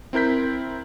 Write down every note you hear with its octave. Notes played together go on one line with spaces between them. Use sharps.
C4 E4 A#4 G6 B6